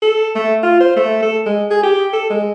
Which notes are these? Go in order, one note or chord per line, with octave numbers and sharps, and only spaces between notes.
A4
A3
F4
C5
A3
A4
G#3
G#4
G4
A4
G#3